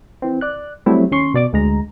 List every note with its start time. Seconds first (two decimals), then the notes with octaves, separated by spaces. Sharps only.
0.22 E3 C4
0.41 D5 F#6
0.86 F#3 G3 A3 C4 E4
1.11 D#2 C#4 C6 C#6
1.34 B2 D5 D6
1.53 D2 G#3 A#5